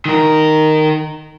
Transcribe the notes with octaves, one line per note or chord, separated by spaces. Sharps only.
D#3 A#4